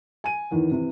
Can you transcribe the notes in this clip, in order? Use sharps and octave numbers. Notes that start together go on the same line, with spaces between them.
G#5 D#7
E2 D#3 E3
C3 E3